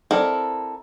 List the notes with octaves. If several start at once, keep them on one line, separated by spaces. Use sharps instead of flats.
C4 E4 A4 A#4 D5